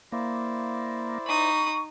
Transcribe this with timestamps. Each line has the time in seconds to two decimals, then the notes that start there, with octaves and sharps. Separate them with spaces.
0.12 A#3 E4 C5 D5
1.26 D#4 B5 C#6 D#6